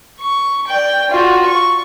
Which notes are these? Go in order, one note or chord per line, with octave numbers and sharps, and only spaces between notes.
C#6
D5 G5
F4 F#4
C#6